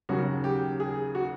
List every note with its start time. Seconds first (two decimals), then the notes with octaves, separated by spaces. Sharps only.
0.09 D#2 C#3 F#3 F#4
0.44 G4
0.80 G#4
1.15 F#4